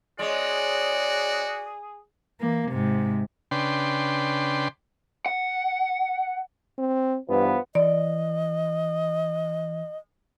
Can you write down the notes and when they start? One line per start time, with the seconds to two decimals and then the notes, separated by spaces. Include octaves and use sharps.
0.19 G#3 C#4 F#4 G#4 D5
2.40 E3 A#3
2.68 G#2 C3
3.51 C#3 D4 B4 G5 C6
5.26 F#5
6.78 C4
7.29 G2 E3 F3 B3
7.75 E3 D5 D#5